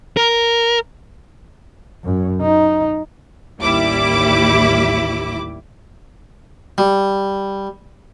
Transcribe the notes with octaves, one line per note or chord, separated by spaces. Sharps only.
A#4
F#2
D#4
A1 D#2 G3 E4 D6
G3